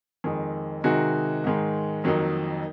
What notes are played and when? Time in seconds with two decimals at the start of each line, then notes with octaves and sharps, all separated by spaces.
0.24 F2 D#3 G#3
0.84 C3 D#3 G#3 D#4 F#4
1.44 G#2 D#3 G#3
2.04 F2 D#3 F#3 A#3 D#4